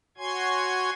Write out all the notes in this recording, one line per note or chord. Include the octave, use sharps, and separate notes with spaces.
F#4 C#5 G#5 C6 G#6